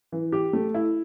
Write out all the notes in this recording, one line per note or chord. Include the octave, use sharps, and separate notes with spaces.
E3
G4
A3
E4